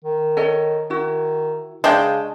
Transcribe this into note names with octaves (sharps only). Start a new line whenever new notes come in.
D#3
A4 C#5 D#5
D#3 E4 F#4
C#3 G#3 D4 D#5 G5 A5